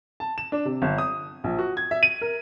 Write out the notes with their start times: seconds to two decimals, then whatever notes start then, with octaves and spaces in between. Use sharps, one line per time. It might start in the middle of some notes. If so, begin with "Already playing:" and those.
0.20 A5
0.38 E7
0.52 D4
0.65 C3
0.82 G1
0.98 D#6
1.44 A#1
1.59 F#4
1.77 G#6
1.91 E5
2.03 D#7
2.21 A#4